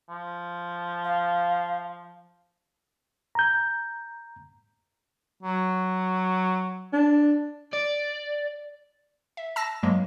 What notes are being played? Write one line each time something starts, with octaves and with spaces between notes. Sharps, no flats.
F3
F5
A#5 G6
F#3
D4
D5
E5
A5 E6 A#6
G2 F#3 G#3 A#3